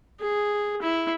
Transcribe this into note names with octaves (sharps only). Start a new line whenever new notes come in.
G#4
E4